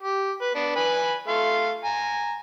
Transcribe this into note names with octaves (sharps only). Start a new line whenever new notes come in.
G4
B4
B3 D4
B4 G#5 B5
A3 F5 C6
G#5 A#5